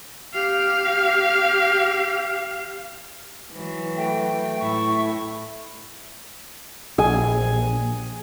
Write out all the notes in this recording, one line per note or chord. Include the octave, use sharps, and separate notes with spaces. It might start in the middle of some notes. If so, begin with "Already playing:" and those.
G4 F5
E3 F#3
A3 G5
A2 E4 C#6
A#1 G#4 G#5